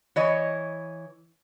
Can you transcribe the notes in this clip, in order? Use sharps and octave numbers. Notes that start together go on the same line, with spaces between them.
E3 C#5 D#5